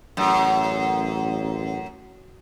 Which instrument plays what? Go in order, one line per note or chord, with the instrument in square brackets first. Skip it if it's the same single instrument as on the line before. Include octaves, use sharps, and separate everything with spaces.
[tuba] A1 [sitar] F#2